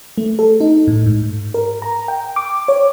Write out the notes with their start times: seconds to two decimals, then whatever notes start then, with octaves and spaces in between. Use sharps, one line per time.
0.18 A3
0.39 A4
0.61 D#4
0.88 A2
1.06 G#2
1.54 A#4
1.82 A#5
2.08 G5
2.36 D6
2.68 C#5